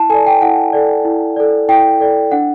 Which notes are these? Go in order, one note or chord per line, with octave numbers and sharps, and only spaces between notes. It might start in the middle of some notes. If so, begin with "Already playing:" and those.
Already playing: E4 A5
A4 D5 G#5
G5
E4 F#5
A4 D5
E4
A4 D5
E4 G5
A4 D5
D4 F#5